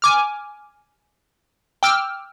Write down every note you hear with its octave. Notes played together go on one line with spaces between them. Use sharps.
G#5 D6 F6
G5 D6 E6 F6